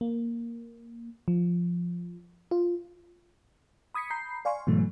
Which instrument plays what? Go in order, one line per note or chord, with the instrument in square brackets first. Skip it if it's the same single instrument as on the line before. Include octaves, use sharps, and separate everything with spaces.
[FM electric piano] A#3
F3
F4
B5 D#6 G#6 B6 C#7
A#5 B5 G6 C7
D5 F5 G#5 C6 C#6
G#2 B2 E3 F#3 A3